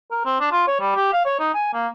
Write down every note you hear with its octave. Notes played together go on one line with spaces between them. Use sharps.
A#4
C4
D4
F4
C#5
G3
G4
F5
C#5
D#4
G#5
A#3